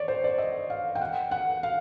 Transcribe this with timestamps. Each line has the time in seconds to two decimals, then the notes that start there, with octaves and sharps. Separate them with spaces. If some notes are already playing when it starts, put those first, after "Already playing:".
Already playing: C#5 D5
0.08 C5
0.24 D5
0.38 D#5
0.70 F5
0.95 G5
1.01 F#5
1.31 F#5
1.63 F5